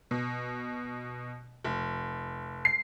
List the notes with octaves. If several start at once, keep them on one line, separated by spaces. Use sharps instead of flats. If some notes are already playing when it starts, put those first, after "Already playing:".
B2
F1
C7